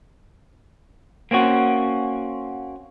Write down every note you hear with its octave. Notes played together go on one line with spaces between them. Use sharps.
A#3 C4 C#4 F#4